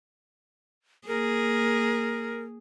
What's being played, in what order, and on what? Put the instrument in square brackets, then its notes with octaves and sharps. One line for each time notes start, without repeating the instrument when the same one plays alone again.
[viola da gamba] A#3 G#4 [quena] A#4